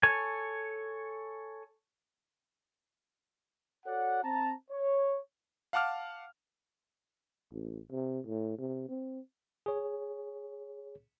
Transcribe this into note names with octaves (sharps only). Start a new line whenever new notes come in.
A4 C#5 G#5
F#4 A4 C#5 D5 F#5
C4 A5 A#5
C#5
F5 F#5 A5 D6 F6
A1
C3
A2
C3
C4
G#4 C#5